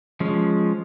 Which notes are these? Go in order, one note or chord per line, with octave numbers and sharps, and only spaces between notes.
F3 G#3 C#4